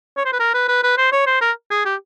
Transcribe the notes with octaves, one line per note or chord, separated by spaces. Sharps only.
C#5
C5
B4
A#4
B4
B4
B4
C5
C#5
C5
A#4
G#4
G4